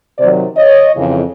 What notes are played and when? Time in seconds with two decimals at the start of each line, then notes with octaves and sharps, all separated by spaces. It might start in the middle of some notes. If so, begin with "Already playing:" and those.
0.18 C3 D#3 F#3 C5 D5
0.56 C#5 D#5
0.95 F2 C#3 E3